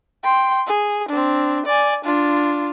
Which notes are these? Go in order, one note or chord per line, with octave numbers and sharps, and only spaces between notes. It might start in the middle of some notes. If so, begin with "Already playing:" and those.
G5 C6
G#4
C4 D4
D5 G#5
D4 F4